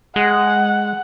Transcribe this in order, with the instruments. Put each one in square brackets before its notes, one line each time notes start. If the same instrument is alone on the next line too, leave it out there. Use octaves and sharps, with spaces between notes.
[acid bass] G#3 [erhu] F#5